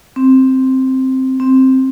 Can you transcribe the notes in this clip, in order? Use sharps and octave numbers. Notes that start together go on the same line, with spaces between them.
C4
C4